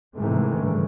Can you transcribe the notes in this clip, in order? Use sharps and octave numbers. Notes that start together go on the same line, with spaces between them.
G#2 C3 D#3 E3 G#3 A3
G2 C#3 G#3